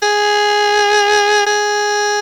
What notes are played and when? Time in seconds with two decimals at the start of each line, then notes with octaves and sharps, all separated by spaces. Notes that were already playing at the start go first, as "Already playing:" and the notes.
0.02 G#4
1.47 G#4